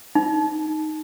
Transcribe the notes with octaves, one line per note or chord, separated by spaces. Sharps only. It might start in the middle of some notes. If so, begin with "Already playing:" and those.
D#4